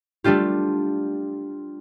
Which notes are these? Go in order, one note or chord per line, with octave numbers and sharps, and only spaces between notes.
G3 A3 D4 F4 G4